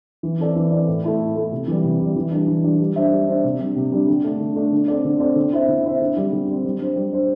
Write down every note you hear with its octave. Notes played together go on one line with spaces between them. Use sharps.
E3
C4 A4 D5
E3
C4 A4 D5
A2
A3 E4 A4
A2
A3 E4 A4
C3
E3 G3
C3
E3 G3
E3
G3 D4
E3
G3 D4
G3
D4 C5 E5
G3
D4 C5 E5
C3
G3 D4
C3
G3 D4
D3
A3 D4
D3
A3 D4
D3
C4 A4 D5
D3
C4 A4 D5
D3
C4 E4 C5 E5
D3
C4 E4 C5 E5
D3
G3 C4
D3
G3 C4
G3
D4 C5
G3
D4 C5